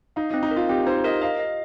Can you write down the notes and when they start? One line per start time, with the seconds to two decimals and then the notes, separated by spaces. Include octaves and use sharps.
0.16 D#4 F5
0.31 D#4
0.34 C4
0.43 D#4
0.51 A#4
0.56 F4
0.69 C4 G4
0.86 D#4 C5
1.04 A#4 D#5
1.22 D#5 F5
1.39 D#5